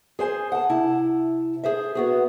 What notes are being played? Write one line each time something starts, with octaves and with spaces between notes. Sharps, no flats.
G#4 C5 G#5
F#5 A5
C3 E4 A5
G#4 C5 E5
B3 F#4 G#4